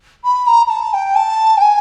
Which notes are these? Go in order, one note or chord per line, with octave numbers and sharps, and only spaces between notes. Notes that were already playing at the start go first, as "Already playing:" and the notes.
B5
A#5
A#5
A5
G5
A5
G5
G#5